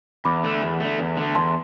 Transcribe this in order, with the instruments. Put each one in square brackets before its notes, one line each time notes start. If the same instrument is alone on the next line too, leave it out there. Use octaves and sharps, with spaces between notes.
[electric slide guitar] E2 [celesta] B5 D6
[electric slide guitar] D3 A3
E2
D3 A3
E2
D3 A3
[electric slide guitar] E2 [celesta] A5 C6